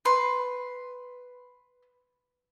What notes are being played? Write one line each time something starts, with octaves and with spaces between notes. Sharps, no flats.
B4 C6